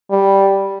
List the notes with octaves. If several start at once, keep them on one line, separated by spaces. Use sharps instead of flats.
G3